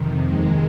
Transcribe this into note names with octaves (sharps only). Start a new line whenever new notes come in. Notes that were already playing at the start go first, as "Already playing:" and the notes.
Already playing: F2 C3 D#3
D#2 D#3 G#3